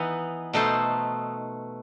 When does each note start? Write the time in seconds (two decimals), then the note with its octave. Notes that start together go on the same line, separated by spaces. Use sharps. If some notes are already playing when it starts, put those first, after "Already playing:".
Already playing: E3 B3 D#4
0.53 B2 A3 D#4 A4 C5